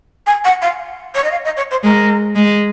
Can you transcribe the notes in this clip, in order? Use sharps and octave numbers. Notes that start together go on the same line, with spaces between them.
G#5
F#5
F5
C#5
D#5
F5
D#5
C#5
C5
G#3 A#4
G#3